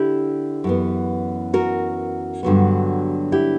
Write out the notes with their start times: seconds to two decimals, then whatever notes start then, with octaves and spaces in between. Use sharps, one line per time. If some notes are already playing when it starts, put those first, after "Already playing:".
Already playing: D3 E4 G4
0.64 F#2 E3 B3
1.54 F#4 A#4
2.43 G2 D3 F#3 B3
3.32 E4 G4